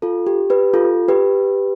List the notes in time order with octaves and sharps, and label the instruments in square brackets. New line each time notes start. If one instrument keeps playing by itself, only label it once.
[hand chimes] F4 A4
G4
G4 B4
F4 A4
G4 B4